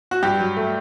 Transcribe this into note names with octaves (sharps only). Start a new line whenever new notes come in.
F#4
G2 G4
F#3
A3